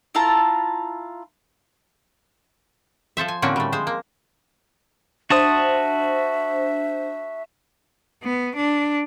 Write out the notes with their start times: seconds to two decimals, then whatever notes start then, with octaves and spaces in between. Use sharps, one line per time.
0.15 E4 F4 A5 A#5
3.17 F3 A4 C5 E5
3.28 G#5
3.42 A2 D3 A#3 C4 C#4 F#4
3.56 G3 A3
3.72 F3 G#3 C5
3.87 A#3
5.30 D4 F#4 C5 E5 A5 D#6
8.23 B3
8.56 D4